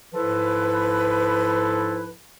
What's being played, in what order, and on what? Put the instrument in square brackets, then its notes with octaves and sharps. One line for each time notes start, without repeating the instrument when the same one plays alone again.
[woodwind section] G#2 F3 E4 A4 B4